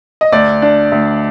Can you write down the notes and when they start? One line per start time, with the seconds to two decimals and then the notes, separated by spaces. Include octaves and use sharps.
0.21 D#5
0.32 D2 D5
0.62 D4
0.92 D2